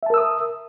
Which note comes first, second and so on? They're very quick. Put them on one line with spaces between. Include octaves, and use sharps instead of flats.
E5 A5 A#4 E6 D#6